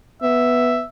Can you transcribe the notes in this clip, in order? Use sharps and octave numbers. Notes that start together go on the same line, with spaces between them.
B3 E5